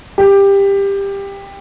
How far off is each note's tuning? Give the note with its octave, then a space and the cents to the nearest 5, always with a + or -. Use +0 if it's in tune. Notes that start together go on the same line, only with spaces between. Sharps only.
G4 +15